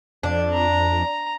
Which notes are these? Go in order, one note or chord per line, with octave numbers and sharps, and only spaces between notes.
F2 D4
A#5